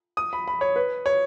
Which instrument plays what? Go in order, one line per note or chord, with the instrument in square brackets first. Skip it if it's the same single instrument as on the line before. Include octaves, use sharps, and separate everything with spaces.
[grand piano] D#6
B5
B5
C#5
B4
C#5